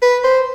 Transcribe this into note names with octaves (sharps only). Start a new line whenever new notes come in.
B4
C5